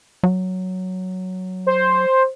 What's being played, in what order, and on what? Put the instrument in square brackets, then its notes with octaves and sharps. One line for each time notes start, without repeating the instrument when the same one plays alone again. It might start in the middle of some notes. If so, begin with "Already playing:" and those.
[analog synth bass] F#3
[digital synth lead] C5